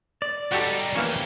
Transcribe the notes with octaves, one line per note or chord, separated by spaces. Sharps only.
D5
G3 D#4 F#4 G4 A4
E3 F3 A#3 C#4 G4